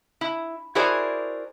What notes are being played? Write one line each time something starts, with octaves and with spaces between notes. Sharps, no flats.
E4
E4 F#4 G#4 A#4 C5 D5